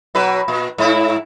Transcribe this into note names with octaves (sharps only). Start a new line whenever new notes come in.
B2 F#3 B4
A#2
G#2 E4